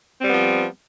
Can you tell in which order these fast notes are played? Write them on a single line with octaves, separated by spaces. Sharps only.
C4 G3 B3 F3